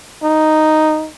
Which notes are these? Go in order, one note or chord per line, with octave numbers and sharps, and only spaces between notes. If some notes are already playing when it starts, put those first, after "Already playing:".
D#4